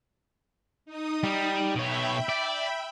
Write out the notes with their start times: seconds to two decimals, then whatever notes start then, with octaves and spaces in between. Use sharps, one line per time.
0.86 D#4 D#6
1.24 G3
1.76 B2 C#5 E5 G5 B5
2.29 D5